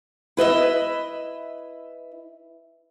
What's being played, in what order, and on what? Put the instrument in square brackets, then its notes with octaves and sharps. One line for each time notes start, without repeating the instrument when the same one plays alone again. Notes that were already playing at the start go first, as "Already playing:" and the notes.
[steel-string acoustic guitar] E4 B4 D#5 E5